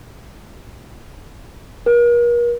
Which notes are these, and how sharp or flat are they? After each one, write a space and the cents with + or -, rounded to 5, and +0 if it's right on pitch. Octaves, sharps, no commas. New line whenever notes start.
A#4 +40